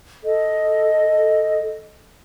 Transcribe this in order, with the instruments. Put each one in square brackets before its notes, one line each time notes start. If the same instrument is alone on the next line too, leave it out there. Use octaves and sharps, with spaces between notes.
[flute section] A4 D#5